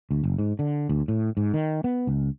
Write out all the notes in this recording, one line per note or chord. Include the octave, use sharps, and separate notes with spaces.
D2
F#1
G#2
D3
D2
A2
G#2
D#3
B3
C#2